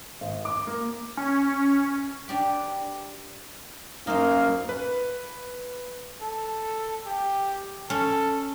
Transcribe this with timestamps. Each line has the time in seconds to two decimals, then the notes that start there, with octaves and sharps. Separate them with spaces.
0.21 G#1
0.45 D6
0.67 A#3
1.17 C#4
2.28 D4 G4 B4
4.07 F#2 A#3 D#4 C5 F5
4.69 B4
6.21 A4
7.06 G4
7.90 C#4 A4